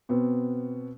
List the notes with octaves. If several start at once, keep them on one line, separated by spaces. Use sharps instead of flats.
B2 B3 C4